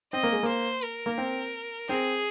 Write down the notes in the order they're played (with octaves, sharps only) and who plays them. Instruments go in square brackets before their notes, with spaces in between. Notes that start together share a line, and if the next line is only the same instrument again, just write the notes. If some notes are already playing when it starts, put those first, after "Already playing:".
[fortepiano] C4 [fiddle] D#5
[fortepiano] A#3
G#3
[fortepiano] A#3 [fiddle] C5
[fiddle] A#4
[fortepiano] A#3
C4
[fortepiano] C4 [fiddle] G#4